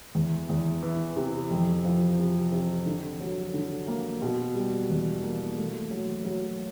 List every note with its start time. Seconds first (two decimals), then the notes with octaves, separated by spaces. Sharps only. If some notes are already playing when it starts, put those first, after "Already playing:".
0.15 E2
0.49 E2
0.82 E3
1.16 C3
1.50 F2
1.84 F3
2.19 C3
2.52 C3
2.86 D3
3.20 F#3
3.54 D3
3.87 A#3
4.22 B2
4.55 G3
4.90 E2
5.23 A#3
5.57 A3
5.91 F#3
6.24 F#3